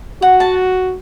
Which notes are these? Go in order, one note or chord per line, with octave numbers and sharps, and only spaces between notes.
F#4 F#5
A5